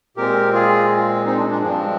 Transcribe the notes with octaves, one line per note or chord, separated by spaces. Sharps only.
A#2 G#3 C4 G4 A#4
F4 G#4
C4 D#4
D4
D4
G2 F3 G#3 C4 D4